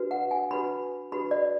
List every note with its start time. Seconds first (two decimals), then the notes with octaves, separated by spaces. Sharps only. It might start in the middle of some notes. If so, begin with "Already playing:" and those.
Already playing: D4 F#4 B4
0.11 F#5
0.31 G#5
0.51 D4 F#4 B4 B5
1.12 D4 F#4 B4 B5
1.31 D5